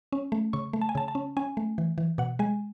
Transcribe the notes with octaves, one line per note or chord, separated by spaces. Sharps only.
C#4
A3
C#3 C#6
A3
A5
G#5
C#3 A5
A5
C#4
C#4 G#5
A3
E3
E3
B2 F#5
G#3 G#5